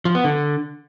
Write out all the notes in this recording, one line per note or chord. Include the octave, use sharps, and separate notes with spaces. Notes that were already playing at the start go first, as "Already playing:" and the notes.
F3
B3
D3